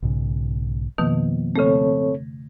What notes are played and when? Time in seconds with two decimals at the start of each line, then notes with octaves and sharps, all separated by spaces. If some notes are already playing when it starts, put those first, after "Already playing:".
0.02 B1 G#2 C#3
0.98 F2 B2 D#3 F3 A#3 B3
1.56 C#3 A3 C4 A4 C#5